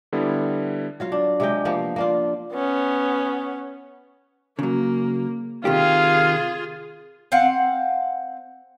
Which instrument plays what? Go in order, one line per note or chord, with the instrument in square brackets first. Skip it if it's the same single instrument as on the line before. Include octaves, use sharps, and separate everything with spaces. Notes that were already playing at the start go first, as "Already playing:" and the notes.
[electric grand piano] D3 G3 B3 E4
[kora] F#3 F4 F5
D4
C3 G#3 G5
F3 A#3 B3
A#3 D4 F4
[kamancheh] B3 C#4
[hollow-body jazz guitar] C#3 F#3 [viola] A#3
[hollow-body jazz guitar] C3 D#3 G4 [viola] F4 G#4 [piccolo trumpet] F5
[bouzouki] C4 F5 F#5